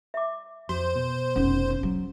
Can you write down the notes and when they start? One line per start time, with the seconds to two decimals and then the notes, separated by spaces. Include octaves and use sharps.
0.14 E5 D6
0.69 F2 F#4 C5
0.95 B2
1.36 F1 D#3 C#4
1.83 F#3